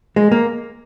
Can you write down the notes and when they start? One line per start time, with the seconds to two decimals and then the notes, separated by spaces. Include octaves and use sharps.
0.16 G#3
0.31 A#3